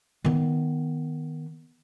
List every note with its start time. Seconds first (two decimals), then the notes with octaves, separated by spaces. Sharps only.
0.25 D#3 B3